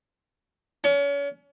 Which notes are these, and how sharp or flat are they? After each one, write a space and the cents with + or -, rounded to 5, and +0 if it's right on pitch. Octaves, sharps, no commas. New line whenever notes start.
C#4 +35